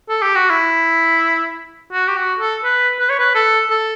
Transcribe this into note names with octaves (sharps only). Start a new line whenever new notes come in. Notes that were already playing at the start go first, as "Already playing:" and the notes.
A4
G4
F#4
E4
F#4
G4
F#4
A4
B4
B4
C#5
B4
A4
A4